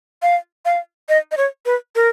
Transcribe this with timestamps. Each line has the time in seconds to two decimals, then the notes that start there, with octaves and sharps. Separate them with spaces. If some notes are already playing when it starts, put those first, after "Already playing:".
0.22 F5
0.65 F5
1.09 D#5
1.32 D#5
1.37 C#5
1.66 B4
1.96 A#4